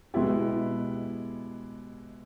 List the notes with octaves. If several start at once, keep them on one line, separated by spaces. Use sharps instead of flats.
B2 G#3 B3 E4 G4